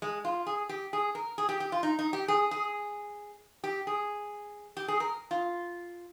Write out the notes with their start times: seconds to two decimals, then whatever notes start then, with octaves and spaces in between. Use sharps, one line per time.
0.02 G#3
0.25 F4
0.47 G#4
0.69 G4
0.93 G#4
1.15 A#4
1.38 G#4
1.49 G4
1.60 G4
1.72 F4
1.83 D#4
1.99 D#4
2.13 G4
2.28 G#4
2.51 G#4
3.64 G4
3.87 G#4
4.77 G4
4.88 G#4
5.00 A#4
5.31 F4